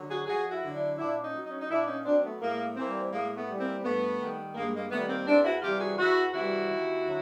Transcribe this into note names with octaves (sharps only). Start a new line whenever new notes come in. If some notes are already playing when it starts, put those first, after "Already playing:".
Already playing: D3 F#3
F#4 G#4
F2 F#4 G#4
E4 F#4
D3 F#3
D4 E4
A#2 D4 E4
C#4 D#4
F#3
C#4 D#4
D#4
A#2 D4 E4
C#4 D#4
F#3 C4 D4
A3 B3
A2 G#3 A#3
E3 G3 A#3 C4
A2 G#3 A#3
A3 B3
E3 G3
A#3 C4
G2 A3 B3
D#3 G3
G2 G#3 A#3
G#3 A#3
D#3 G3 A3 B3
A#3 C4
E2 C4 D4
E4 F#4
C3 E3 G3 F4 G4
F#4 G#4
E2 E4 F#4
C3 E3 G3 E4 F#4
D#2
D3 F#3